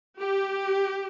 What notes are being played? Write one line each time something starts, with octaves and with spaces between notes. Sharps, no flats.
G4